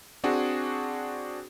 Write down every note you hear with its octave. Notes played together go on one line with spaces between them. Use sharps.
C4 D4 F#4 G#4